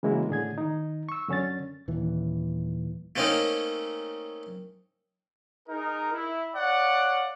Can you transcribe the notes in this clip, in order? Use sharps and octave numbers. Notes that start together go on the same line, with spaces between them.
C#3 E3 G#3 A#3 E4 F#4
A2 D3 G#4 G#6
D#3 D#4
C#6 E6
F#2 D3 C#4 C#5 A6
D#1 D#2 E3
A3 A#3 C4 C#4 D#4 A#4
D#4 G#4 A#4
E4
C#5 D5 F5 F#5